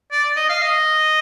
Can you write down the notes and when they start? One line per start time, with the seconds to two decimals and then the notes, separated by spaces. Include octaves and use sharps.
0.12 D5
0.36 D#5
0.49 F5
0.62 D#5